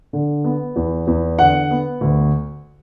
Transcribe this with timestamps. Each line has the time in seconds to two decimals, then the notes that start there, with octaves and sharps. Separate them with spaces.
0.13 D3
0.44 B3
0.76 E2
1.07 E2
1.39 D3 F#5
1.71 B3
2.01 D2